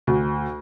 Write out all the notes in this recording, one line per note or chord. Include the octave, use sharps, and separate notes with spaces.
D2